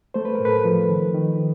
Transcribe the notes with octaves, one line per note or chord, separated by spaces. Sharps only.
A3 C5
B4
A2 A#4
A4 B4
F3
D#3
D#3